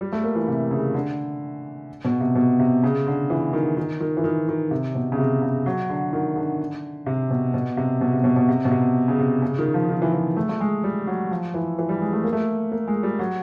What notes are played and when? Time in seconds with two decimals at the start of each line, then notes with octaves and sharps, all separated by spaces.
0.01 G3
0.12 A3
0.24 A#3
0.35 E3
0.48 C3
0.71 C#3
0.94 D3
2.05 B2
2.21 C3
2.35 B2
2.60 C3
2.84 C#3
3.07 D3
3.30 E3
3.53 D#3
3.77 D#3
4.00 D#3
4.17 E3
4.24 D#3
4.48 D#3
4.71 C3
4.95 B2
5.12 C#3
5.18 C3
5.42 C#3
5.66 F#3
5.90 D3
6.13 D#3
6.36 D3
7.06 C3
7.31 B2
7.54 B2
7.77 C3
8.01 B2
8.13 C3
8.24 B2
8.36 B2
8.49 C3
8.65 B2
8.71 C3
9.08 C#3
9.19 C3
9.42 C#3
9.58 D#3
9.74 F3
9.89 D#3
10.02 E3
10.13 E3
10.37 A3
10.49 A3
10.60 G#3
10.84 G3
11.07 F#3
11.31 F3
11.54 E3
11.78 E3
11.89 G3
12.01 G#3
12.13 A3
12.23 A#3
12.33 A3
12.71 A#3
12.88 G#3
13.03 G3
13.19 F#3